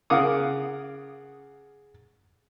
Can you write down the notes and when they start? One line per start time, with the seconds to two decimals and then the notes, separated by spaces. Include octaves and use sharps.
0.10 C#3 A#4 F5 F#5 D6 D#6